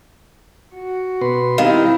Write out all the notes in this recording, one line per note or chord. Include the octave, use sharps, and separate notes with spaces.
F#4
B2 B4 C6
D#3 G3 C4 E4 F5